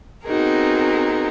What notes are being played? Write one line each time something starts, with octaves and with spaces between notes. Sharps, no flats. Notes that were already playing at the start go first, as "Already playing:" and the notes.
B3 C4 D#4 F#4 G#4 A#4